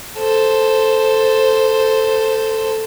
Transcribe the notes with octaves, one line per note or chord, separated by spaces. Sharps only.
A4 C5